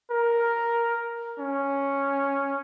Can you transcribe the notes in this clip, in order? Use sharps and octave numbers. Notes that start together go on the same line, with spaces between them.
A#4
C#4